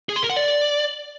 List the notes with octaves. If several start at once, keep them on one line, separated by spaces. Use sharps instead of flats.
G#4
C6
A#4
F#5
D5